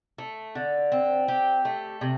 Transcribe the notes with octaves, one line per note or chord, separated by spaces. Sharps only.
A3
D3
C4
G4
A3
C3